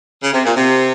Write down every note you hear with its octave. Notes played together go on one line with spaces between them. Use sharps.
C#3
C3
A#2
C3